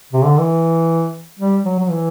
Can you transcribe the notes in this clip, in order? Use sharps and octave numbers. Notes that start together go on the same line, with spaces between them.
C3
D3
E3
G3
F#3
F#3
E3